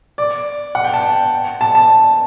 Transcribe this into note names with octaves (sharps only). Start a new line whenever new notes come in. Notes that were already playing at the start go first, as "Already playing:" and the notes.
D5
F#5
G5
A5
G5
A5
A5